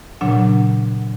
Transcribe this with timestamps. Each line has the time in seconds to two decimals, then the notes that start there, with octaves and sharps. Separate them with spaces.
0.21 A#2 C#3 F#3 D4 F#5